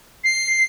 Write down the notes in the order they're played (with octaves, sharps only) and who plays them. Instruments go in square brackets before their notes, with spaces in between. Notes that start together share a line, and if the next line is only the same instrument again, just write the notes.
[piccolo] C7